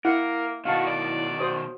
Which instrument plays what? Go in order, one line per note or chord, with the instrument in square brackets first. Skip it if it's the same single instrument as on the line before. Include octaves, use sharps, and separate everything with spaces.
[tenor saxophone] A#3 [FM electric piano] E4 [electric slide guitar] A#4 [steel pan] F#5
[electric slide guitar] B2 D#3 [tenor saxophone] F#4 [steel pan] F5 A5
[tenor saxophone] D5
[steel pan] F#4 C5 D#6